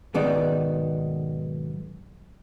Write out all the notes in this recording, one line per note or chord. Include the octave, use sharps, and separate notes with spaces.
B1 G#2 D#3 B3 D#4 D5